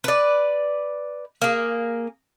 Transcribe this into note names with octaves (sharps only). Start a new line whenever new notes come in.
B4 D5
A#3 G#4